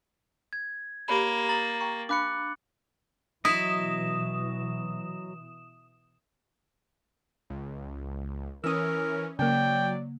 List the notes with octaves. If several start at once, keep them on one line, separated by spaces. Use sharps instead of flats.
G#6
A#3 G4 C#5 B5
A#5 D#6 A6 F#7
G5 A#5 C#6
D4 F5 B5 D6 F#6 C#7
B2 E3 F#3 E4 D#5 D#6 E7
C#2
E3 C#4 A#4 D#6 E6
C#3 F#3 A#3 D5 G5